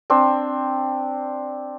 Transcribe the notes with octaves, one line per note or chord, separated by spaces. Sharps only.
C4 D4 C5